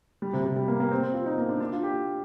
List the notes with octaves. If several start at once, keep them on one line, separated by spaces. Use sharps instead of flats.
G3
C3
C3
G3
A#3
A#3
C4
C4
F4
D#4
A#3
D4
D4
F4
G4